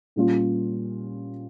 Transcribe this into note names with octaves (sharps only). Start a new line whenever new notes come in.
A#2 G3 C#4 F4